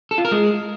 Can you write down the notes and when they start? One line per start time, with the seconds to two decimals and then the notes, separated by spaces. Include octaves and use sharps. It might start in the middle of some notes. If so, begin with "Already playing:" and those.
0.11 A4
0.18 F4
0.25 A#4
0.31 G#3